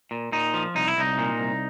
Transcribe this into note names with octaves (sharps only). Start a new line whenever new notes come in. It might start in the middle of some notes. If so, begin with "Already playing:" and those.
A#2
A#2 D#4
F3
C2 D#4
E4
C2 D#4
A#2
C2